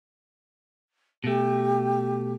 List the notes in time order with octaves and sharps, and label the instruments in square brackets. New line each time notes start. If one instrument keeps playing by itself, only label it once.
[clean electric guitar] B2 A3 [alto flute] G4